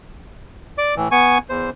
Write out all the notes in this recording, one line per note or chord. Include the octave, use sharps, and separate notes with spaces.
D5 D6
A2 E3
B3 G#5 C#6
E2 C5